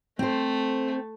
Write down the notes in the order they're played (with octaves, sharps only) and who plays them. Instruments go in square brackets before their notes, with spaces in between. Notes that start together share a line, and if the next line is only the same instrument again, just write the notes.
[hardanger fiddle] A3 [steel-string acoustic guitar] C4 C5